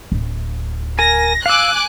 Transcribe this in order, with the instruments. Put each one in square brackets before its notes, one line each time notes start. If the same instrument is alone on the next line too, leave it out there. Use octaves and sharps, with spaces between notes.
[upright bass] D1
[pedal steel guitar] A#4 G#5 [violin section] A#6
[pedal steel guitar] F5 E6 [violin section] G#5 D6 F#6